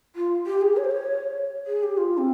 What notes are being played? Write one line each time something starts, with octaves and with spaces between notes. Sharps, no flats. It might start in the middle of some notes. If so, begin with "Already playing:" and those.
F4
G4
G#4
C#5
C5
C#5
G#4
G4
F4
C4